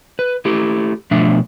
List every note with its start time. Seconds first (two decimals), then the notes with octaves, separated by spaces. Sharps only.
0.19 B4
0.45 A3 E4 G4
1.11 B2 F3 A3 D4 E5